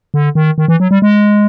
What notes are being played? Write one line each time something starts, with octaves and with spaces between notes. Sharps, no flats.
D3
D#3
D#3
E3
F#3
G3
G#3